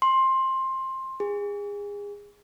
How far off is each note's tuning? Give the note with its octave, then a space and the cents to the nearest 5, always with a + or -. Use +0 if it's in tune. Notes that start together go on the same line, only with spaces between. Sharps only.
C6 +15
G#4 -30